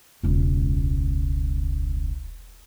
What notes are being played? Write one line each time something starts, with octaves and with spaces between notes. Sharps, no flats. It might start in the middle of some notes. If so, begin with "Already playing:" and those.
E1 C#2